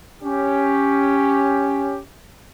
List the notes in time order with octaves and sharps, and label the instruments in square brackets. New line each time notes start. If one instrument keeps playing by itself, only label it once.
[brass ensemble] C#4 G4